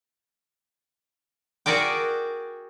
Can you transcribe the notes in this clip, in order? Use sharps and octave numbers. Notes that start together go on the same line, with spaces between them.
F#4 G#4 A#4 D5 G5